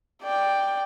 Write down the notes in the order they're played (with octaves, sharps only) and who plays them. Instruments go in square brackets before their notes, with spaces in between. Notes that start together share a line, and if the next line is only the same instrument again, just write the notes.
[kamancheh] D5 G5